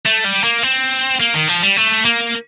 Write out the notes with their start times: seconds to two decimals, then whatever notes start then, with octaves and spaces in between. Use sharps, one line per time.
0.06 A3
0.25 G3
0.44 A#3
0.63 C4
1.20 A#3
1.34 D#3
1.48 F3
1.62 G3
1.76 A3
2.05 A#3